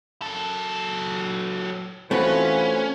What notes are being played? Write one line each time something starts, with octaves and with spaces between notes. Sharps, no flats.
F#3 A4
E3 A3 C4 C#4 F4 F#4 B4